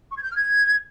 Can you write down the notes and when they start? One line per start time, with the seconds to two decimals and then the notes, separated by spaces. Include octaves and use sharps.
0.11 C#6
0.17 G#6
0.23 G6
0.29 F6
0.35 G#6